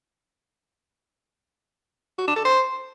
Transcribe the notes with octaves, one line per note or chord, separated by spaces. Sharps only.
F#4
D4
A4
C5